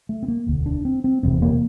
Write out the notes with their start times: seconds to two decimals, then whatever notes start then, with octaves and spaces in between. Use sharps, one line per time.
0.09 A3
0.23 C4
0.28 A#3
0.46 E1 D2 D3
0.66 D4
0.85 C4
1.04 C4
1.23 F1 E2 C3 C4
1.42 A#3